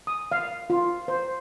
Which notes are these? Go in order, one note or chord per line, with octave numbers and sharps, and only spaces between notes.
D#6
F5
F4
C5